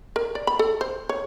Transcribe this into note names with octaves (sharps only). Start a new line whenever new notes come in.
A#4
D5
B5
A4
C5
C#5